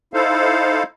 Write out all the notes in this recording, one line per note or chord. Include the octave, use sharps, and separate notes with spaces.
D#4 E4 A4 C5 F5